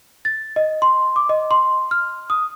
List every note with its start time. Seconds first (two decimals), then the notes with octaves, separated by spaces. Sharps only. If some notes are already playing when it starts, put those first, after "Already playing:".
0.25 A6
0.56 D#5
0.82 C6
1.16 D6
1.29 D#5
1.51 C6
1.91 F6
2.30 D#6